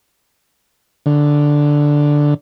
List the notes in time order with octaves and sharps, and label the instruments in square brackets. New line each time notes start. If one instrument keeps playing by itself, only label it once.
[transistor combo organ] D3